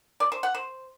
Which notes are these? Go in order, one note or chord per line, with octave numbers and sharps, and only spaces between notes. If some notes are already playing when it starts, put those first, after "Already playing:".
D5
C5
F#5
C5